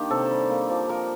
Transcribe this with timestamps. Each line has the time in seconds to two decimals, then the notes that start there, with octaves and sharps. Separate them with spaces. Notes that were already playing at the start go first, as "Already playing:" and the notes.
Already playing: D#3 A#3 D4 G4
0.11 C3 A4
0.31 G3
0.50 A#3
0.70 F3
0.89 F3 A#4